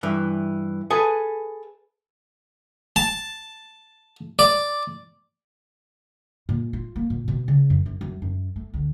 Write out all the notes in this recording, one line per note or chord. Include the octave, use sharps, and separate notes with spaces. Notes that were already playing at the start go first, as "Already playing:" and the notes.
G2 E3
G#4 A4 B4
A5
D5
A#2
F4
A#3
A#2
B2
C#3
F#2
F#2
F#2
F#2
A3
D2